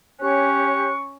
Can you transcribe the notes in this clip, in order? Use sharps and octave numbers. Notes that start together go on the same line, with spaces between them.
C#4 G4 C#5 C#6 F#6